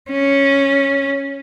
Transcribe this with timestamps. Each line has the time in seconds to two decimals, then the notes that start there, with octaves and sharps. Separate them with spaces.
0.11 C#4